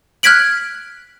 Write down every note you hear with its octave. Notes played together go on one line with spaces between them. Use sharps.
F6 F#6 G#6 B6 D7 F#7